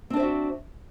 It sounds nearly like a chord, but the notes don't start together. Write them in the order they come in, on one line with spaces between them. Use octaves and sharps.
C4 D4 C5 E5 F#4